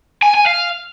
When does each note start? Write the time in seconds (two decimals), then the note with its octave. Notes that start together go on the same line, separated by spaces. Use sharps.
0.23 G#5
0.35 G#5
0.47 F5